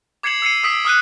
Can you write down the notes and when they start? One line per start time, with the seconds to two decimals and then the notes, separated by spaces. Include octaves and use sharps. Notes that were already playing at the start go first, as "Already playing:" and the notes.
0.23 D6 G#6 C7 C#7 E7 F#7
0.42 E6 C7 C#7 D#7
0.63 D#6 E6 B6 D7 F#7
0.85 D#6 F6 F#6 D#7